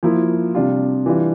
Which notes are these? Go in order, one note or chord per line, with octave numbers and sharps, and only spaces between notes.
F3 A#3 E4
C3 G3 D4 F4
E3 G3 D4 F4